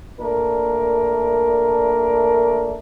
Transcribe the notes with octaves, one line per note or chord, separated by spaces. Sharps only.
A#2 A3 D4 A#4